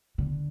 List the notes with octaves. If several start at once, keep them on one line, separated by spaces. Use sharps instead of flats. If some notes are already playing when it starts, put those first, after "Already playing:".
D3